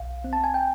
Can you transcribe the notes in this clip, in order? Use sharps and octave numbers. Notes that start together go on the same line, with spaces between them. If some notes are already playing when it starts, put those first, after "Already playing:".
Already playing: B1 F5
C4
A5
G#5
G5